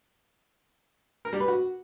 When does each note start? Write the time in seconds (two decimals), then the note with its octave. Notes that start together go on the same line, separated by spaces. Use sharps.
1.25 A#4
1.33 G3
1.40 B4
1.48 F#4